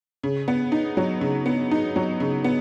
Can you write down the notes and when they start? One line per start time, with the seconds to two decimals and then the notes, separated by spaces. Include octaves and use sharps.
0.23 C#3
0.48 B3
0.72 D#4
0.97 F#3
1.21 C#3
1.46 B3
1.71 D#4
1.96 F#3
2.20 C#3
2.44 B3